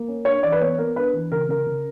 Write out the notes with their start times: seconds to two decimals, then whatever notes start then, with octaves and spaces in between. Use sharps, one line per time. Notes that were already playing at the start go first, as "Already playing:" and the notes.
Already playing: A#3
0.08 C#4
0.25 D4 C#5
0.43 E3 D5
0.52 B4
0.61 B3 C#5
0.78 B3 A#4
0.96 D4 B4
1.13 E3
1.31 C#3 A#4
1.49 C#3 A#4
1.66 C#3